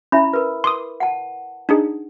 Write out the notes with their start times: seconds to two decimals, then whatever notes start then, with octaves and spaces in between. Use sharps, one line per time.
0.12 C#4 E4 E5 B5
0.33 A#4 B4
0.64 C6 D6 D#6
1.00 F#5 A5
1.69 D4 D#4 G#4